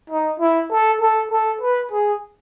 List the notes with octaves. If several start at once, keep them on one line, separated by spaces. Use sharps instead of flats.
D#4
E4
A4
A4
A4
B4
G#4